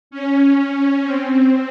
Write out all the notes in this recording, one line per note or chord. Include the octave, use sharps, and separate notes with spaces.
C#4
C4